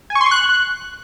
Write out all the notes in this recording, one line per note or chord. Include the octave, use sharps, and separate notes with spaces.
G#5
C#6
C6
C#6
F#6